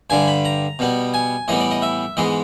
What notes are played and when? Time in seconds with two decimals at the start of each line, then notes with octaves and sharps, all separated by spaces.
0.10 G2 D3 G3 G#5
0.27 B5
0.45 A#5
0.79 B2 G3 B3
1.14 G#5
1.48 A2 E3 G3 B3 D#5
1.60 D5
1.71 D#5
1.82 E5
2.17 G#2 E3 G#3 B3 D#5